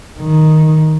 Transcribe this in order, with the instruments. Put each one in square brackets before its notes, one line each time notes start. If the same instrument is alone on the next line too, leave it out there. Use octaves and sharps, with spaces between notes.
[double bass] D#3